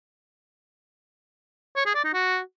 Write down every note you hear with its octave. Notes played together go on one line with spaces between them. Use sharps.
C#5
G#4
D5
D#4
F#4